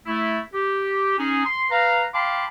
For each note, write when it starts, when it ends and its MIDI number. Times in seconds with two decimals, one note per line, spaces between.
0.07 0.40 57
0.07 0.40 64
0.54 1.18 67
1.18 1.45 61
1.18 1.45 63
1.18 1.45 68
1.46 1.65 84
1.71 2.05 71
1.71 2.05 77
1.71 2.05 82
2.14 2.46 77
2.14 2.46 79
2.14 2.46 81
2.14 2.46 83
2.14 2.46 84
2.14 2.46 86